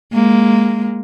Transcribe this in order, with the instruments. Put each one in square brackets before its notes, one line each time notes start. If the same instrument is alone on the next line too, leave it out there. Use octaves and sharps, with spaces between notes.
[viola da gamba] G#3 A#3